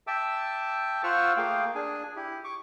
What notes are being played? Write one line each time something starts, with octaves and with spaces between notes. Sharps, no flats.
E5 G5 A5 D6 E6
F4 C5 F#5 C#6 E6 F6
A3 A#3 G#4 F5 G5
D4 G#4 G#5
E4 G4
C#6 D6